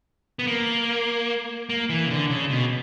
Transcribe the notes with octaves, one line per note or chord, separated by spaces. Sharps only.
B3
A#3
A#3
E3
C#3
D3
C#3
B2